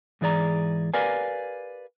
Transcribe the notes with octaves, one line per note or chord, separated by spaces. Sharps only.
G#2 E3 G#4 D5 A#5
G4 A#4 B4 D5 F5 G#5